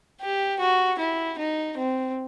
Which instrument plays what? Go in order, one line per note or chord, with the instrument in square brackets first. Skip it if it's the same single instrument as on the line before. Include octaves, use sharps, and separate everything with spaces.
[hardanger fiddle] G4
F#4
E4
D#4
C4